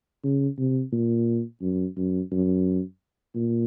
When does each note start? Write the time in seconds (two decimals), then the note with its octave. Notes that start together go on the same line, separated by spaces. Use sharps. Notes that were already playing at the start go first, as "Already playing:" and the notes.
0.24 C#3
0.58 C3
0.93 A#2
1.61 F#2
1.97 F#2
2.32 F#2
3.36 A#2